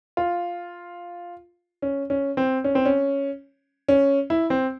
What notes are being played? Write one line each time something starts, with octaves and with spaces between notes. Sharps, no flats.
F4
C#4
C#4
C4
C#4
C4
C#4
C#4
E4
C4